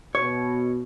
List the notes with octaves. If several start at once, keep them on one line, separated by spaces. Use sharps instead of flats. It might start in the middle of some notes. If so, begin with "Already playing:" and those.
B2 C#5